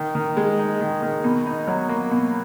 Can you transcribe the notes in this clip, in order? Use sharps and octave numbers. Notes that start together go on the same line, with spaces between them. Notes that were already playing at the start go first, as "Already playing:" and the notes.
Already playing: D#3
D#3
G#3
D#4
D#3
D#3
B2
D#4
F#3
A#3
B2